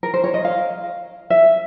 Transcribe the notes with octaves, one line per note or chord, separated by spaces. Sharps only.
A#4
C5
C#5
D#5
F5
E5